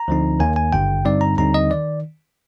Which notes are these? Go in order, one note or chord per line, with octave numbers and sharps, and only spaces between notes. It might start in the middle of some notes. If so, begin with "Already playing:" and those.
Already playing: A#5
D2 D3 F3 C4 D#4
D#2 D#3 A#3 G#5
G#5
G#1 G2 D3 G5
G2 D3 G3 C4 D#4 D5
A#5
D#2 D3 G3 C4 D#4 A#5
D#5
D#3 D5